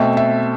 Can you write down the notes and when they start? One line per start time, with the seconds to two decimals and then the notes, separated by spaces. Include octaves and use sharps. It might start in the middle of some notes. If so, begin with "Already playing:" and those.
Already playing: B2 A3 C4 E5
0.17 E5